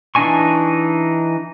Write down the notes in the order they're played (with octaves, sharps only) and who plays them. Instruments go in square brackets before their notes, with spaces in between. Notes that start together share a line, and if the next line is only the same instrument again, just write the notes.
[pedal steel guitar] E3 D4 D#4 G#5 C#6